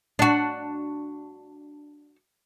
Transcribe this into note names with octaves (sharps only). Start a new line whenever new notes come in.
D4 F#4